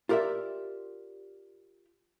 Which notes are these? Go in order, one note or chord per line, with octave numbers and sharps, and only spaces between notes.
F4 G4 A#4 D5 E5